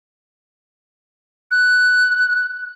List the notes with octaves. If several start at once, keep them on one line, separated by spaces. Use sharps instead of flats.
F#6